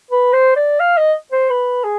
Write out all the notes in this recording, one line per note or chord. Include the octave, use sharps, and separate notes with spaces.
B4
C5
D5
F5
D#5
C5
B4
G#4